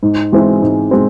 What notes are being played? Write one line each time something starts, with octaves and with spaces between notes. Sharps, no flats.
G#2
E3 G#3 C4
G#2
G#3 C4